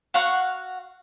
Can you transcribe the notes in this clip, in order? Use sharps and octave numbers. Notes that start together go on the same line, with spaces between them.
F#4 F5 F#5 C#6